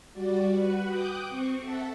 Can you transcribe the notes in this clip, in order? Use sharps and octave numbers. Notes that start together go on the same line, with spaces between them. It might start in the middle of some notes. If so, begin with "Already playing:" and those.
G3 F#4 D5
F#4 B4 F#5
G5 D6 D#6 F#6 G6
C4 C#6
A4 E5 F#5 A5